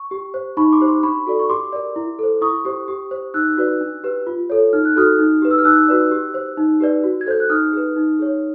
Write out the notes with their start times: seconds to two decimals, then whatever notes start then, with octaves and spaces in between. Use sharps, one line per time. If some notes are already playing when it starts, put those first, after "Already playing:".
Already playing: C#6
0.11 G4
0.34 C5
0.57 D#4 B5 C#6
0.73 C6 D6
0.80 G4 C5
0.88 C6 D6
1.03 D4 B5 C#6
1.26 F#4 A4 D5
1.39 C#6
1.49 G4 C6 D6
1.73 A#4 D5
1.96 E4
2.19 A4 C5
2.41 E4 C#6 D#6
2.65 G4 C5
2.88 G4
3.11 C5
3.34 D#4 E6 F#6
3.57 F#4 B4 D5
3.81 D4
4.04 G4 B4
4.27 F4
4.50 A4 C#5
4.73 D#4 F6
4.85 F#6
4.96 F#4 A4 D#6 F6
5.19 D#4
5.42 G4 B4
5.51 E6
5.58 F6
5.65 D#4 E6 F#6
5.88 F#4 B4 D5
6.11 G4
6.34 C5
6.57 D#4
6.80 G4 B4 D5
7.04 F#4
7.21 G#6
7.26 A4 C5 G6
7.40 F#6
7.50 D#4 D#6 F6
7.73 G#4 B4
7.96 D#4
8.19 G#4 C#5